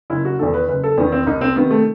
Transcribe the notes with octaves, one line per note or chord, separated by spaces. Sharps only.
F#1 E4
F#4
E2 D#3 A4
B4
F#1 B4
A4
E2 D#3 B3
C4
C2 D#4
C4
C3 D#3 B3
A3